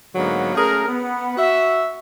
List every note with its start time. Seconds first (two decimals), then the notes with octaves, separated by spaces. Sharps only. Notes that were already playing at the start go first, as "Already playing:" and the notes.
0.15 G#2 D3 F#3 A#3 B3
0.55 A3 C#4 G#4 A#4
0.88 B3
1.37 F#4 E5